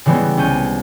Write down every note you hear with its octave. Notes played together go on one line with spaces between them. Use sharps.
C#3 E3 G3 G#3 B3
C2 C#4 G6 D#7